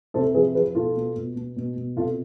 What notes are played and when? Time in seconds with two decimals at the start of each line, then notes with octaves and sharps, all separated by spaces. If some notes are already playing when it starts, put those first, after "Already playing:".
0.14 C3 A4 C5
0.34 F3 G#4 B4
0.55 F3 G#4 B4
0.75 B2 F4 A4
0.96 B2
1.16 B2
1.36 B2
1.57 B2
1.76 B2
1.96 C3 F4 A4